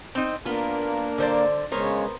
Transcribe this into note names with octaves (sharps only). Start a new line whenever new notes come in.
C4 D#4
A#3 B3 D4 F4 A#4
D3 C5 D5
C#3 G#3 B3 A#4 C5 C#5